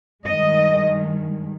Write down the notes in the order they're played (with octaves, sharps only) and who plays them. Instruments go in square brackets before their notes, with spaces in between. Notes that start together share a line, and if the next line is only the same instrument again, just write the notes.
[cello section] G2 D#3 G#3 D#5